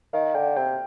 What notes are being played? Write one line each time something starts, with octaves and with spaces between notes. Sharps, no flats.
D#3 F5
D3 G5
C3 G5